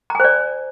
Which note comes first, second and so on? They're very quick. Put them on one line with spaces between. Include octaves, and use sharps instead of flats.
A#5 G#5 C5 D5